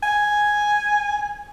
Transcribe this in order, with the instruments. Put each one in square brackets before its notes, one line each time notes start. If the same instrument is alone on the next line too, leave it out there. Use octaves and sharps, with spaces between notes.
[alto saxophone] G#5